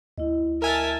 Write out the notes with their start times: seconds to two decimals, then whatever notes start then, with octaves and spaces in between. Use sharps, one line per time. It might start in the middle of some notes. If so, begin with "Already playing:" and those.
0.18 D2 E4 D#5
0.62 A#4 E5 G#5 A5 F6